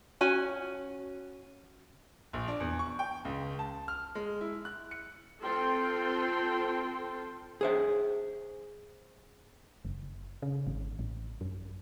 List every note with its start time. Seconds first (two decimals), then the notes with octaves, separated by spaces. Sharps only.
0.21 C#4 F#4 G#5
2.33 A#1
2.48 D4
2.60 E2
2.79 C#6
2.99 G5
3.25 C#2
3.59 A5
3.88 F6
4.15 G#3
4.41 E4
4.65 F#6
4.91 C#7
5.43 C4 F4 A4 G5 C6
7.61 G#4 C5 E5
9.85 F#1
10.42 C#3
10.67 G#1
10.99 A1
11.41 F#2